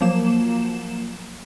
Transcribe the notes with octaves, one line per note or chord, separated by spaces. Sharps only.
F3 F#3 A#3 E7